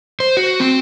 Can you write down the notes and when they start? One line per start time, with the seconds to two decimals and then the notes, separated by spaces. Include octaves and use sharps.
0.20 C5
0.37 F#4
0.60 C4